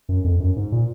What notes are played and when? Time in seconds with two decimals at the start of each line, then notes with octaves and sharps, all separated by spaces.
0.09 F#2
0.24 F2
0.40 F#2
0.56 G#2
0.72 A#2